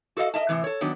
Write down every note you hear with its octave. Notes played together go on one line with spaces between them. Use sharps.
F#4 A4 B4 D#5 F5
A#4 D#5 E5 A5
A2 C3 E3
A4 C#5
D#3 F#3 B3 D4